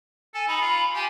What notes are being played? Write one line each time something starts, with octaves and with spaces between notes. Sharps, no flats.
A4 G#5
D#4 B5
F4
G4 G#5